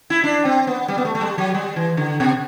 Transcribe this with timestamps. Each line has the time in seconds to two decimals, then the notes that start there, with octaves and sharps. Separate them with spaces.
0.10 E4
0.24 D4
0.45 C4
0.67 B3
0.88 G3
0.98 B3
1.05 A3
1.15 A3
1.21 G3
1.38 F#3
1.55 G3
1.76 E3
1.97 D3
2.20 B2